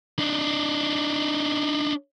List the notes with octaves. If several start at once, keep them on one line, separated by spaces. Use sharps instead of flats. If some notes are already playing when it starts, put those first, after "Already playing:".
D4 D#4